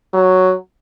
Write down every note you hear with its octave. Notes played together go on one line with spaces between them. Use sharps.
F#3